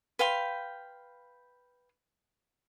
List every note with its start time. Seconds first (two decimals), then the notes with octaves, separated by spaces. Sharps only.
0.19 B4 F5 G5 C6